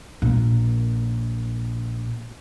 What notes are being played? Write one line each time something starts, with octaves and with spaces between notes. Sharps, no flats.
A#1 A#2